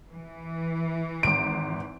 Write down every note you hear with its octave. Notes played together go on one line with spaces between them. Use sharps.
E3
G#1 D7